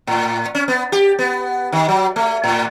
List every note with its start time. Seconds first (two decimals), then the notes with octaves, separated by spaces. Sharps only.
0.07 A2
0.55 C#4
0.68 B3
0.92 G4
1.19 B3
1.72 D#3
1.88 F#3
2.16 A3
2.44 A2